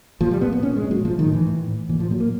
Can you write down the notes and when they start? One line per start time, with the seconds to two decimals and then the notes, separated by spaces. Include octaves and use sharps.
0.21 A#2 F3
0.31 G3
0.41 A#2 B3
0.52 B3
0.62 A#2 C#4
0.76 G#3
0.84 A#2
0.91 F#3
1.04 A2 F3
1.19 D#3
1.26 A2
1.33 E3
1.46 A2
1.68 A2
1.89 A#2 E3
2.00 F3
2.10 A#2 F#3
2.20 A#3